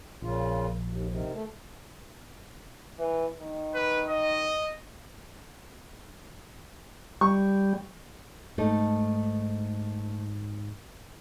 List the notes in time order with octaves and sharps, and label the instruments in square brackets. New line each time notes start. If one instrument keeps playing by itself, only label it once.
[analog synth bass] A#1 [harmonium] A#2 C#3 F4
[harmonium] D#2
C3 D#3
A3
[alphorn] E3
D#3
[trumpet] B4
D#5
[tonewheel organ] G3 [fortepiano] C#6
[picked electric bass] G#2 [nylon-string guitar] A3 A#3 D#4